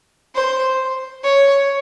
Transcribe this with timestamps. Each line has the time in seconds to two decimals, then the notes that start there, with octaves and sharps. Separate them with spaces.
0.35 C5
1.24 C#5